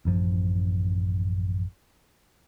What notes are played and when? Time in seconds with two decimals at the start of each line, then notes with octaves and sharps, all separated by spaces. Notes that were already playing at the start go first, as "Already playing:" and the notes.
0.05 A1 F#2 F3